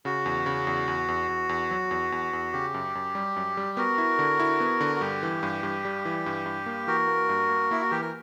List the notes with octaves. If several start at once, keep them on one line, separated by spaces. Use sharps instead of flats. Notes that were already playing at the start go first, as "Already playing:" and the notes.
C#3 F#4
E2
C#3
E2
E2
E2
E2
E2
F#3
E2
E2
E2
C#3 G4
F#2
F#2
G3
F#2
G3
B3 F#4 A#4
E4
D3
E4
B3
D3
F#4
G2 G4
E3
G2
G2
G3
E3
G2
G2
A#3
E3 F#4 A#4
A#3
G2
A#3
A#3 E4
F#4
E3 G4
A#4